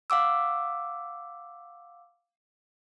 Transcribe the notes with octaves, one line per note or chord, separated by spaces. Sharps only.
F5 F#5 D6 E6